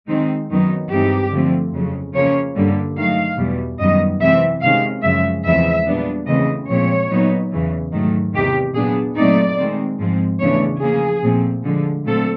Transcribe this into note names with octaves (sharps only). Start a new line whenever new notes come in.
D#3 G#3 C4 D#4
F#2 D#3 F#3 B3 D#4
G2 E3 G#3 C4 D#4 G4
D3 F3 A3 C4
F2 C#3 F#3
C#3 F3 A#3 C#4 C#5
G2 D3 G3 A#3
D#3 F#3 A3 F5
E2 B2 G3
F#2 D#3 G3 B3 D#5
C3 E3 G#3 C4 E5
C3 D#3 G#3 C#4 F5
F#2 C#3 F3 G#3 E5
E2 C#3 F3 G#3 C4 E5
A#2 G3 B3 D4
C#3 E3 A3 C4 D#5
A#2 F3 G#3 C4 C#5
A#2 F#3 B3 D#4
E2 C#3 E3
G#2 D#3 F#3 A3
E2 C3 D#3 G4
A#2 F#3 B3 D4 G#4
A#2 F#3 A3 C4 D#4 D5
D#3 G#3 C4
G#2 F3 G#3 C4
E2 C#3 E3 A3 D4 C#5
C#3 F3 A#3 G#4
A#2 F3 A3 C4
D3 F3 G#3
A#2 F#3 A3 C4 A4